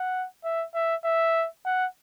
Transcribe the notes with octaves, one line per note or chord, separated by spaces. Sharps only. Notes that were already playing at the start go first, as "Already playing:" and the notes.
Already playing: F#5
E5
E5
E5
F#5